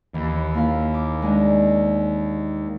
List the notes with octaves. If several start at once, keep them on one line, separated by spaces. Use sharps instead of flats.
D#2 E3
A#3 E4 F5
D6
G#3 D4 D#4